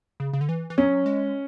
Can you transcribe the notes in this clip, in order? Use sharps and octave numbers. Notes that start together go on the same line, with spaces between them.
C#3
C#3
D3
E3
E3
F#3 C#4
G#3